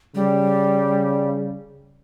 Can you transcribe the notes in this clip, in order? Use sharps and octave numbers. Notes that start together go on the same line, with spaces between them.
C#3 G3